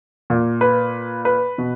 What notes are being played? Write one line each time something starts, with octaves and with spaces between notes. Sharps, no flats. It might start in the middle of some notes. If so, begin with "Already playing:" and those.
A#2
B4
B4
B2